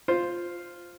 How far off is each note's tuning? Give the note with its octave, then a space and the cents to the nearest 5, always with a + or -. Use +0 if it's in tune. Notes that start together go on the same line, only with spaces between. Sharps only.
F4 +0 C5 +0